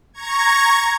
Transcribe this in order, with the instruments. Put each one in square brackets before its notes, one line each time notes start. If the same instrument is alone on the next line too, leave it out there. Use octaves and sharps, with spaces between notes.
[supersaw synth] A#5 C#6 G#6